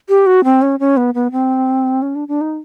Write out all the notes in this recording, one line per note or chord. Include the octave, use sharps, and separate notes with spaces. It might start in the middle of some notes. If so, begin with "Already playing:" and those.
G4
F#4
C4
C#4
C#4
B3
B3
C4
C#4
D4
D4
D#4